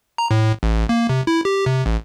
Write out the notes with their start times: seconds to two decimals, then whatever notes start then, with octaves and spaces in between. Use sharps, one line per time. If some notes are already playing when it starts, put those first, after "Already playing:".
0.18 A#5
0.31 A2
0.63 A1
0.89 A#3
1.09 C3
1.27 E4
1.45 G4
1.66 C3
1.86 A1